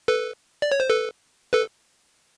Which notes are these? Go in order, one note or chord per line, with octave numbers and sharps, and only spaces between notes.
A4 B4
D5
C#5
C5
A4 B4
A4 B4